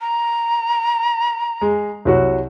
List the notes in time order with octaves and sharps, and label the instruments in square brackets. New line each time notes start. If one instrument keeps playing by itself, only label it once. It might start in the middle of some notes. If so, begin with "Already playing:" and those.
[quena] A#5
[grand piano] G#3
C2 F#3 F#4